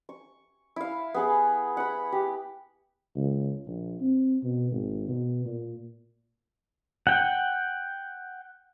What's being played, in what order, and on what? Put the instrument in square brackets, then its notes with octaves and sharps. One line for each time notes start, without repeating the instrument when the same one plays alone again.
[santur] C#6
E4 F5
B3 G#4 F#5
F#5 B5
G4
[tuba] C#2
A#1
C4
B2
G#1
B2
A#2
[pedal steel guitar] F#5 G5